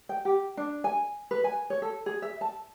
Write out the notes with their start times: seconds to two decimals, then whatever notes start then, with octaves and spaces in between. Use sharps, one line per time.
0.09 G5
0.25 G4
0.57 D4
0.84 G#5
1.31 B4
1.44 G#5
1.70 C#5
1.82 A4
2.06 G#4
2.22 E5
2.41 A5